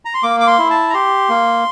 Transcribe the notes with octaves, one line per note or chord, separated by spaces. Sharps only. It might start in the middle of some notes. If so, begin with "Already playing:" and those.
A#5
C6
A#3 D6
D6
C6
E4
A5
A#5
G4 C6
A#3